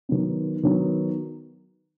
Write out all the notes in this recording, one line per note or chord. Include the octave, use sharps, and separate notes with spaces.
D#3 F#3 B3
D#3 F#3 B3